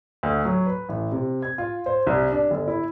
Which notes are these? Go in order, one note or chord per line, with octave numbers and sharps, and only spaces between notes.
D2
F#3
B4
A1
C3
G#6
F4
C5
C2
D4
G1
E4